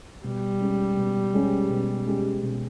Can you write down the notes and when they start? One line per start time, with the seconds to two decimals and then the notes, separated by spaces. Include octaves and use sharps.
0.24 B2 G3
0.61 G#3 C#4 G4
0.97 B2
1.34 G#3 C#4 G4
1.70 B2
2.06 G#3 C#4 G4
2.43 B2